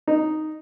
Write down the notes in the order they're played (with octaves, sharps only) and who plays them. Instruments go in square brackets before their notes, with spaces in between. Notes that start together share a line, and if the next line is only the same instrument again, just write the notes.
[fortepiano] D#4